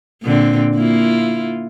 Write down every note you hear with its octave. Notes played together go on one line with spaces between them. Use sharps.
A#2 D3 C4
A#3 E4 F4